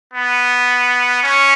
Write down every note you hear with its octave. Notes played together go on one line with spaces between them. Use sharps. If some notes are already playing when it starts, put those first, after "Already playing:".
B3
C#4